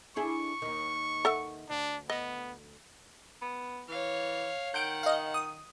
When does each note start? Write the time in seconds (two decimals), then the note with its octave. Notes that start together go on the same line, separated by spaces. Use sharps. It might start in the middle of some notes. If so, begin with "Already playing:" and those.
0.16 D4 E4 G#4 C#6
0.62 D#2 D#3
1.25 A4 E5 F#5
1.70 D2 D4
2.10 B3 D#5
3.42 B3
3.89 E3 C#5 F5
4.74 D#3 F#5 G6 D7
5.03 D#5 F5
5.34 D#6